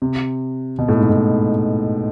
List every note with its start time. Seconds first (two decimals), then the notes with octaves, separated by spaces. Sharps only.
0.02 C3
0.78 B2
0.88 A2
0.98 G#2
1.09 A2